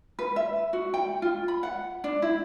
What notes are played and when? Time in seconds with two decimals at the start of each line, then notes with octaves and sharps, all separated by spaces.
0.19 B4
0.36 E5
0.73 F#4
0.94 G5
1.22 F4
1.48 B5
1.63 F#5
2.04 D4
2.22 E4